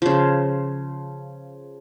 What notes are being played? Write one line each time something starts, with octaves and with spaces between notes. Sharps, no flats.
C#3 F3